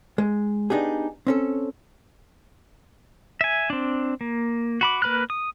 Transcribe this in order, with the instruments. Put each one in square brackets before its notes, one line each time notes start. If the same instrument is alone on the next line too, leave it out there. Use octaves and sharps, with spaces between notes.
[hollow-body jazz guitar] G#3
B3 D4 D#4 G4 G#4
C4 C#4 A4
[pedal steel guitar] E5 G#5
C4 D4
A#3
F#4 B5 D6
A#3 B4 B5 F6 F#6
D#6